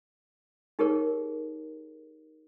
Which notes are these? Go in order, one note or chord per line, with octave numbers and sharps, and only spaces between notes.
D#4 G4 G#4 A#4 C#5